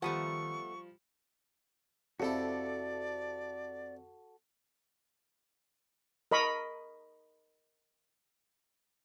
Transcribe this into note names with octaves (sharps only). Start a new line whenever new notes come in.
D#3 F3 G3 A3 B3 F#5 C#6
F2 C3 E4 F#4 A4 D5
A#4 D#5 B5 C#6